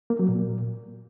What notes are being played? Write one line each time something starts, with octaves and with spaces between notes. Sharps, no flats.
A#3
F#3
A#2